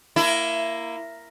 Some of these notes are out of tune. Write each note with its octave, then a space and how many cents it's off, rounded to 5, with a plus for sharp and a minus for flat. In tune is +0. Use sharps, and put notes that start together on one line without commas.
A#3 +0 E4 +20